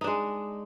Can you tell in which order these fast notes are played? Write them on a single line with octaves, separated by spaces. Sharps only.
D#4 D4 G#3